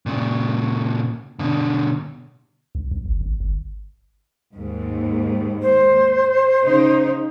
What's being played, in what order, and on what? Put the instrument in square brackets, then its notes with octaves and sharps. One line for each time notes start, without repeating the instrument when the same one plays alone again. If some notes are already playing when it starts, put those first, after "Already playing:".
[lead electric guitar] A#2 C#3
B2 D3
[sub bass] B1
B1
G1
G#1
G1
[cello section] D#2 G#2
[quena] C5
[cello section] C#3 D#4